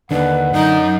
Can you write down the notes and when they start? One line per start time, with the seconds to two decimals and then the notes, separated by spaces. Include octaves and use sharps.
0.11 D#2 D3 D4 B4 F#5
0.53 F#2 D#4 A#4